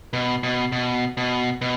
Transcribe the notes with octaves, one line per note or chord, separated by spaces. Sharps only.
B2
B2
B2
B2
B2